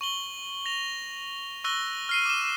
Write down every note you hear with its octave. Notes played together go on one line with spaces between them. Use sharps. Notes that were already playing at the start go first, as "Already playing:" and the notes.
C#6 F#7 G7
A#6 F7
C#6 E6 F#6 A#6 G7
F6 C7 D#7
D6 E7